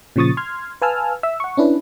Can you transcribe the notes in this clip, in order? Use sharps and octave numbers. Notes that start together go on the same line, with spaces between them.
A#2 C#3 F3 C#6 D#6 A6
C6 F6 G#6
B4 F5 G#5 A5 E6 F6
E5 E6
F#5 C#6
C#4 D4 E4 B4